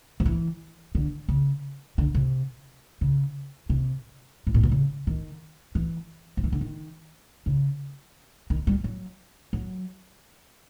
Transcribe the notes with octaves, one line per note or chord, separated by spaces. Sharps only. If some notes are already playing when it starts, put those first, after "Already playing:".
F3
E3
D3
C#3
D3
C3
C#3
C3
A2
A#2
B2
C#3
D#3
E3
F3
E3
D3
D#3
C#3
D#3
G3
F#3
F#3